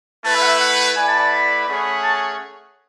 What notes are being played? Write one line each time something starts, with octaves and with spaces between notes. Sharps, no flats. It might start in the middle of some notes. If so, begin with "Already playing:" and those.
A3 E4 B4 A5
E5
F#5
E5
F#5
A3 E4 B4 D5 F#5 G#5
A5
A5
B5
A3 C#4 G#4 C#5 F#5 B5
A5